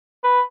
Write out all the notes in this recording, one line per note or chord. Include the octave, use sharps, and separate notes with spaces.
B4